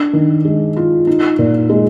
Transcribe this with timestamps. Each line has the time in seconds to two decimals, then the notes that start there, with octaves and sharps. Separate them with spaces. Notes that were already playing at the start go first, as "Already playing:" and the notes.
Already playing: D4
0.13 D#3
0.45 G#3
0.76 F4
1.07 D#4
1.39 A#2
1.70 G#3